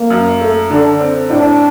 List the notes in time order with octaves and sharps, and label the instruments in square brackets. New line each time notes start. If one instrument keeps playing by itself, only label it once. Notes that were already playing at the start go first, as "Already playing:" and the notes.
Already playing: [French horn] A#3
[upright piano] F#2
A3
[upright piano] D3 [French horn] D4
[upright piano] C4
[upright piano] A2 [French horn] D4